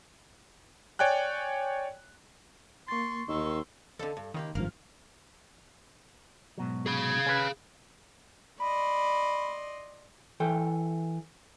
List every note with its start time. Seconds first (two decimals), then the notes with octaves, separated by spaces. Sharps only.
0.99 C#5 D5 G5 G#5 F#6
2.88 A#3 C6 C#6 A6
3.28 D#2 D#3 D#4 C6 C#6 E6
3.99 D#2 D3 A4
4.17 G2
4.34 C#2 D#3 A#3 G4
4.55 G#1 G2 F3 A#3 F6
6.58 G#2 B2 F#3
6.86 G#4 F5 G#6
7.26 C#4 B4
8.60 D5 D#5 B5 C6
10.40 E3 A4 G5